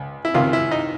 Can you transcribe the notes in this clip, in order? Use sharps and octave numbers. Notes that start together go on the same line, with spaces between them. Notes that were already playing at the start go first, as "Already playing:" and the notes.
Already playing: C#2
E4
C#2 C3 D#3 F4
E4
D#4